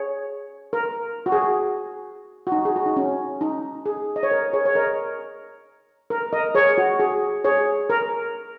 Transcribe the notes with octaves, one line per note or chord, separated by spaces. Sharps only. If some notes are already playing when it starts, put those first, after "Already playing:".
Already playing: G#4 C#5
A#4
F#4
G#4
F#4
D#4
G#4
F#4
D#4
C#4
D#4
G#4
D#5
C#5
A#4
G#4 C#5
C#5
A#4 D#5
A#4
A#4 D#5
G#4 C#5
F#4
G#4
G#4 C#5
A#4